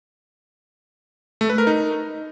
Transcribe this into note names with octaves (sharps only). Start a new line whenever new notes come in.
A3
B4
A#4
D#4